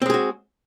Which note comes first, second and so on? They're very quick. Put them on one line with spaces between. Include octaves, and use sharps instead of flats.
C4 G#3 G#4 F#4